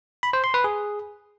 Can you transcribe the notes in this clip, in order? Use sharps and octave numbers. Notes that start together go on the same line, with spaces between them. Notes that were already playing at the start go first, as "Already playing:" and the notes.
B5
C5
C6
B4
G#4